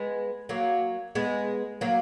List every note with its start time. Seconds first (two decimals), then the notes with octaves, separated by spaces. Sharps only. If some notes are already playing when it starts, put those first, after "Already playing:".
Already playing: G#3 B3
0.49 F#3 A#3
1.15 G#3 B3
1.81 F#3 A#3